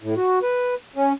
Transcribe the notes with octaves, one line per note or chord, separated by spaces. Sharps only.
A2
F#4
B4
C#4